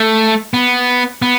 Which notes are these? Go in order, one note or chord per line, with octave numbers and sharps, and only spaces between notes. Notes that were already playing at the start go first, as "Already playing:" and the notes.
Already playing: A3
B3
B3